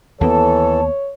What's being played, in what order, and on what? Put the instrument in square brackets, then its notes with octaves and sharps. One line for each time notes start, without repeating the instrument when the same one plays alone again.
[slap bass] D#2 A#3 B3 [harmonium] E3 A4 [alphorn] C#5 [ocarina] A5